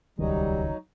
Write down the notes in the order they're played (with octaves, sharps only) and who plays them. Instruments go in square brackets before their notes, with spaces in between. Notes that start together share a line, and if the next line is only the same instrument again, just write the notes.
[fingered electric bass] D#1 C#2 D#3 [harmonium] F#3 D#4 [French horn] G3